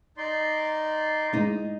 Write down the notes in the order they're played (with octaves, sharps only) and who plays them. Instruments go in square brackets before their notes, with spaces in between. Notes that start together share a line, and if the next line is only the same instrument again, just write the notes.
[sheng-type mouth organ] D#4 D5 C6
[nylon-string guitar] G#3 D#4